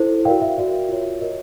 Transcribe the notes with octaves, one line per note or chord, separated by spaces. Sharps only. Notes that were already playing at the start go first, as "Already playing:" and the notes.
Already playing: E4 A4 C5
F#4 A#4 D5 F5 G5
E5
F#4 A#4 D5
F4 A#4 C#5
F#4 A#4 C#5 D#5